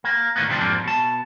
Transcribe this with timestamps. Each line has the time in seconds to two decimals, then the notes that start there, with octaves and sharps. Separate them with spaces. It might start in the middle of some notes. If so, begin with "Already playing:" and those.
0.04 A#3
0.36 D2 A2 D#3 A#3 B3
0.48 D2 C3 F3 A#3 C4 D4
0.60 F2 G#2 F3 G3 A#3
0.84 B2 A5